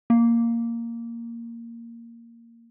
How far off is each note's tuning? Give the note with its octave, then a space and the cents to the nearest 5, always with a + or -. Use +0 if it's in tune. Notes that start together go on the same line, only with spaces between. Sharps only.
A#3 -5